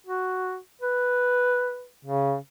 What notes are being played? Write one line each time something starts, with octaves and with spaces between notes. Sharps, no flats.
F#4
B4
C#3